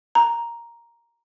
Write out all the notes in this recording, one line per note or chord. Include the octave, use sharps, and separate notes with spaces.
A#5